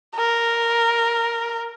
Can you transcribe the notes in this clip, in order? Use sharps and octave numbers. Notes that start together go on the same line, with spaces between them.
A#4